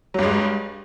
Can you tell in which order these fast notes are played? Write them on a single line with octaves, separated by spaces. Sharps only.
F#3 G2 G#3